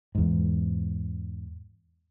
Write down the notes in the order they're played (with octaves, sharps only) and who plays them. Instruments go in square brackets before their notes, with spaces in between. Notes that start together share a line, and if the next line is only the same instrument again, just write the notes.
[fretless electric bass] E2 G#2